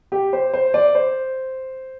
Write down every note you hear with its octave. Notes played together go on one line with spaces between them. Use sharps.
G4
C5
C5
D5
C5